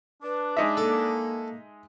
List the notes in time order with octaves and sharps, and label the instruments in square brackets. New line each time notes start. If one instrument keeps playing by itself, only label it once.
[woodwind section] D4 [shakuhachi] B4
[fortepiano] G#3 D#4 E5
[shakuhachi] A#3 [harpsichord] A4